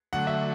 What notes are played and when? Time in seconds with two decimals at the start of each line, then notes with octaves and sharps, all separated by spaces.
0.13 D3 F#3 A3 F#5
0.27 E5